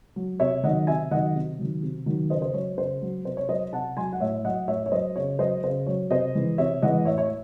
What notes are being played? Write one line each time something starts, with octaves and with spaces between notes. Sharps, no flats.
F#3
C3 C#5 E5
D#3 F#3 D#5 F#5
C3 E5 G#5
D#3 F#3 D#5 F#5
C3
D#3 F#3
C3
D#3 F#3
C#3 C5 D#5
C5
F#3 C#5
C#3 C5
F#3
C3 C5
C#5
F#3 C5 D#5
C3 F#5 A5
F#3 G#5 C6
F#5
A2 C#5 E5
F#3 D#5 F#5
A2 C#5 E5
C#5
F#3 C5 D#5
C#3 C#5
F#3 C5 D#5
C#3 C5
F#3 C#5
C3 C5 D#5
E3 G#3
C3 C#5 E5
E3 G#3 D#5 F#5
A2 C#5 E5
C#5 E5